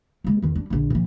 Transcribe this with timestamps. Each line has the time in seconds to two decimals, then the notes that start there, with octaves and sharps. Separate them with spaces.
0.24 G#3 A#3
0.42 E2 D#3
0.56 G3 D4
0.70 A#1 D3
0.90 A#2 F3